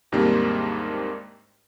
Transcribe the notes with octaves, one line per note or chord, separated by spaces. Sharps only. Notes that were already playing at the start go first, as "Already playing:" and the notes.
D#2 G#2 C3 G3 A#3 D4